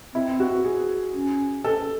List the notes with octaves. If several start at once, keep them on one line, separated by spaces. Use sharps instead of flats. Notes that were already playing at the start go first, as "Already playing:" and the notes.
C4 E4
F#4
G#4
C#4
A4